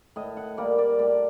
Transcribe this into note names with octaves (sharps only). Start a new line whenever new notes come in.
A2 D#5
F#5
G3 A#3 D5
D5
A2 D5